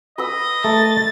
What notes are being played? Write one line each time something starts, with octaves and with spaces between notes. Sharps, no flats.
B4 D#5 E6
A3 A#4 A6